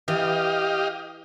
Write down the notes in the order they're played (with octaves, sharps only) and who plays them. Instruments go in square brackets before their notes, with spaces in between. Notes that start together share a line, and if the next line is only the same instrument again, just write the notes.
[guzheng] E3 [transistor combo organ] G4 D#5 F5